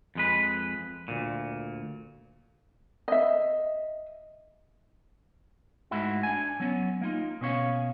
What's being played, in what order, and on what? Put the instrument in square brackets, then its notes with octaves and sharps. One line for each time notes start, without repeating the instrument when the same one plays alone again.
[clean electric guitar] F2 G#3 B4
D2 A#2
[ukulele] D#5 E5
[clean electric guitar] G#2 A3 E4 F#4
D4 G#5
F#3 B3 C#4
A#3 D#4 F4
B2 C#4 C#5 F5